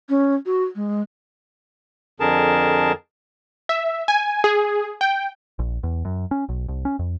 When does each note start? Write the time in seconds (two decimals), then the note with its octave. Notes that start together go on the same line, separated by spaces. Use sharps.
0.09 C#4
0.46 F#4
0.75 G#3
2.20 F2 D3 G#4 A#4 A5
3.69 E5
4.08 G#5
4.44 G#4
5.01 G5
5.59 A#1
5.83 E2
6.05 F#2
6.31 C#4
6.49 B1
6.68 C2
6.85 C#4
6.99 F2